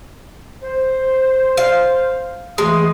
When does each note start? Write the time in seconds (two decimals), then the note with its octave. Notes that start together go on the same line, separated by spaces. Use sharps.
0.63 C5
1.57 F5
2.58 E3 G#3 A3 D#6